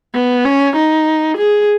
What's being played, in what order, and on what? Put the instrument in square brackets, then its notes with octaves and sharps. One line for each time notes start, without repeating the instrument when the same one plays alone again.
[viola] B3
C#4
D#4
G#4